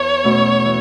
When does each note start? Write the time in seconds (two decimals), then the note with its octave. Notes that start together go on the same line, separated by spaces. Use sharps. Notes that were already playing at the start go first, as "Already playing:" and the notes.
Already playing: E2 C#5
0.24 B2 A3 C#4
0.65 E3